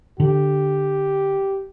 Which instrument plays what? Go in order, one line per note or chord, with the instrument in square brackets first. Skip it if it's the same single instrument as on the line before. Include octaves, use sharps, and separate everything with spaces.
[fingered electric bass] D3 [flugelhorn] G4